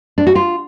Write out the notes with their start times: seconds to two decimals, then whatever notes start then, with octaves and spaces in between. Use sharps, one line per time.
0.18 D4
0.27 F#4
0.35 F4